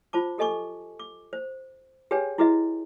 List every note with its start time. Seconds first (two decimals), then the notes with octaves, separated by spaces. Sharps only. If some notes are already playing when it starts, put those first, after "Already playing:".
0.13 F4 C5 A5 D6
0.38 G4 A4 D#5 G#5 C#6 D6
1.00 D6
1.33 C5
2.11 G4 G#4 B4 C#5 G5 G#5
2.38 E4 F#4 G#4 B4 D#5 E5